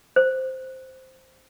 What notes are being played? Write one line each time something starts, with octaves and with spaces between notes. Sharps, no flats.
C5